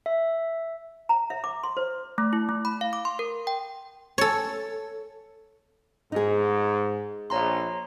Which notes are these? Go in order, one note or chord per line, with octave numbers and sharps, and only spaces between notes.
E5
A#5
E5
D6
C6
C5
A3
E4
A3
B5
F5
D6
C6
A#4
G5
A4 C#5
G#2 D#4 G#4
A#1 C#5 A#5 C6